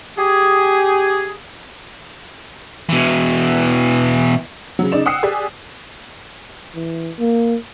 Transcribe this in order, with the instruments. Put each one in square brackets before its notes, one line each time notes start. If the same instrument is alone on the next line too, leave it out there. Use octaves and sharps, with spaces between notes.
[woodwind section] G4 G#4
[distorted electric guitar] B2 E3
[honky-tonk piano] C#3 F#3
C#3 D#4 D5 E7
F#5 G5 D#6 E6 F#6 C7
G4 G#4 D5 G#5
[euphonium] E3
A#3